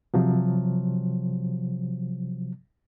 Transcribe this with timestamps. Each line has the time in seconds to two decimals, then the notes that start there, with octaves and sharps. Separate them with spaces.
0.14 C3 F3 F#3